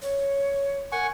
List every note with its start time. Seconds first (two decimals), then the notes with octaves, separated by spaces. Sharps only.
0.02 C#5
0.92 A#4 F#5 G#5 C#6